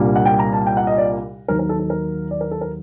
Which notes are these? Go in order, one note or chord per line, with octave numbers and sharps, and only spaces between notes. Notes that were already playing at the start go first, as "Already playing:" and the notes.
Already playing: C2 A#2 G3 A#3 D4
F#5
G5
A#5
A5
G5
F#5
D#5
D5
D#2 D#3 F#3 A#4
A#4
A4
A4
A#4
D5
A#4
A4
A#4